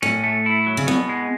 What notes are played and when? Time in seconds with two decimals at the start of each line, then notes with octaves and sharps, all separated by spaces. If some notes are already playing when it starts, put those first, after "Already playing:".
0.02 A2 C#4
0.24 A3
0.46 E4
0.67 F#3
0.77 C#3
0.87 B2 B3
1.09 G#3